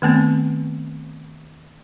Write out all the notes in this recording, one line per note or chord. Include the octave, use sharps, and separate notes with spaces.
D#3 A3 B3 C4